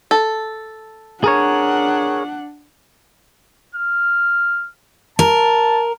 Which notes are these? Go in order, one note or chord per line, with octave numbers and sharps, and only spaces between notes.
A4
D4 G#4 A#4 C#5 F#5
F6
A#4 A5